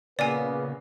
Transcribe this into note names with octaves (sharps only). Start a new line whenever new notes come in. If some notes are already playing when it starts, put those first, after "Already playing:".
A#2 C#3 A#3 B3 B4 D5 G#5